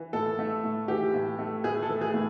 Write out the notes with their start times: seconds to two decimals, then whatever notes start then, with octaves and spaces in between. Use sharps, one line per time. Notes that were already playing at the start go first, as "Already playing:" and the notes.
Already playing: E3
0.13 A2 A4
0.39 A3
0.64 A2
0.88 E3 G4
1.14 A2
1.39 A3
1.64 A2 G#4
1.83 A4
1.89 E3
2.01 G#4
2.14 A2